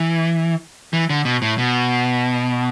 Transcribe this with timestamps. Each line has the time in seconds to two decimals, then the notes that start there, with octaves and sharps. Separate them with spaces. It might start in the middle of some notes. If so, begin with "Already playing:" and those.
Already playing: E3
0.93 E3
1.10 D3
1.25 B2
1.42 A2
1.58 B2